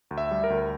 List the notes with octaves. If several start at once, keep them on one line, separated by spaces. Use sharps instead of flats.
D2
E5
G3
A#4
D2